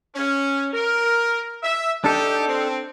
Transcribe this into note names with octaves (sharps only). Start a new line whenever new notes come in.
C#4
A#4
E5
D4 D#4 G4 A4
C4